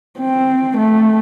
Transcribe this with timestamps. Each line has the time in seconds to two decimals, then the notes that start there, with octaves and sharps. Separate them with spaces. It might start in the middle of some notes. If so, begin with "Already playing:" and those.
0.19 C4
0.78 A3